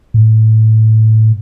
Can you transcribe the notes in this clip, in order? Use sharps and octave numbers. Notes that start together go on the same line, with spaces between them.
A2